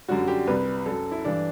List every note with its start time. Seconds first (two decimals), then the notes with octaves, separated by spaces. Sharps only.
0.08 F#2 D3 G3 F#4
0.28 G4
0.47 C2 C3 G3 B4
0.86 F#2 F#3 A4
1.11 E4
1.24 G2 E3 G3 D4